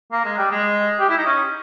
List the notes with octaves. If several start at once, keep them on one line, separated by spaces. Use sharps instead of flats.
A#3
G#3
G3
G#3
G4
E4
D#4
C#4